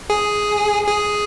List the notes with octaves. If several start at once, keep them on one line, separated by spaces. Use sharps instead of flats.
G#4
G#4